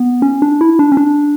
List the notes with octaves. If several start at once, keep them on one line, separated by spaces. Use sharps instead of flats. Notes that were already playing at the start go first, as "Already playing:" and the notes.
Already playing: B3
C#4
D4
E4
D4
C#4
D4